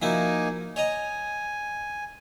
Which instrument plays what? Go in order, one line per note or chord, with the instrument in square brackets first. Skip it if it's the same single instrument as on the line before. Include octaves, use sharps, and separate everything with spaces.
[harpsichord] F3 E4 F#4 [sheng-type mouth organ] A#3 D#4 G#5
[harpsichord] C#5 D#5 A#5 [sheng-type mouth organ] G#5